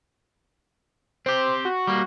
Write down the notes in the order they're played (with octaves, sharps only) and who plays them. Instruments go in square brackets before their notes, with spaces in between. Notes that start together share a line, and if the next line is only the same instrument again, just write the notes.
[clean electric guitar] C4 G4 [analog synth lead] C5
[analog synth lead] F#4
[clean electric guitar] G3 A#3